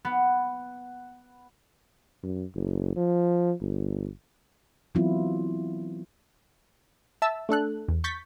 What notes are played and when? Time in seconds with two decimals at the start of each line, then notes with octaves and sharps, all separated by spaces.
0.05 B3
2.23 F#2
2.55 F#1
2.96 F3
3.60 G1
4.95 E3 F#3 B3 C4 E4 F4
7.22 E5 A5 E6
7.49 A3 D4 A4 F#6
7.88 E2
8.04 C#6 G6 A6 B6